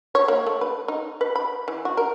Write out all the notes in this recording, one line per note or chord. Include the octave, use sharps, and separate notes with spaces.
C#5
A#3
A3
B4
D#4
B4
B5
E3
F#4
A#4